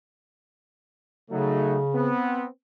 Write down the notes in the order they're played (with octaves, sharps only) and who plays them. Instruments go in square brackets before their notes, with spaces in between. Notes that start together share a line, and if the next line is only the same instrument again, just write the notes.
[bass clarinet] C#3 [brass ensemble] F#3 A3 D#4
[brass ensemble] B3 C4